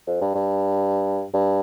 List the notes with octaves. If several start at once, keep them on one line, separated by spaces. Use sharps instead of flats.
F2
G2
G2
G2